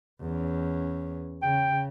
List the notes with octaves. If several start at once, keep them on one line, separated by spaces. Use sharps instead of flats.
E2 C#4
C#3 G5